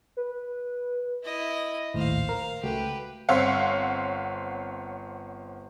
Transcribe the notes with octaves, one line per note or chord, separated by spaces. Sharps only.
B4
E4 D#5
A#1 D#2 A2 C5 F5
A#4
C#2 A3 F#4 G4 B4
G1 C4 C5 C#5 F5 F#5